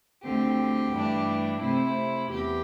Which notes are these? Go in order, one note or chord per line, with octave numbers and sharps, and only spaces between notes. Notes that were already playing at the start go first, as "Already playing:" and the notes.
D2 D3 C4 G4
G2 E3 A3 D4
C3 A3 C4 E4
E2 G4